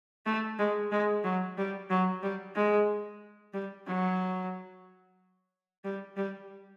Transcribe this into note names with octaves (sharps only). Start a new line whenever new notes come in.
A3
G#3
G#3
F#3
G3
F#3
G3
G#3
G3
F#3
G3
G3